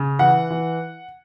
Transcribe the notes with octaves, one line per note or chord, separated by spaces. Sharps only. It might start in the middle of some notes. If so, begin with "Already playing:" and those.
Already playing: C#3
E3 F#5
E3